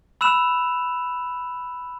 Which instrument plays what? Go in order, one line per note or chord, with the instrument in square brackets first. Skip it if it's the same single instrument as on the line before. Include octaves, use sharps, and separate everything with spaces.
[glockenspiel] B5 E6 F#6 E7 F7